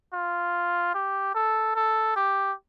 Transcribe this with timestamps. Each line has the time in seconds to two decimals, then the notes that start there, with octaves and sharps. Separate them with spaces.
0.13 F4
0.94 G4
1.35 A4
1.76 A4
2.16 G4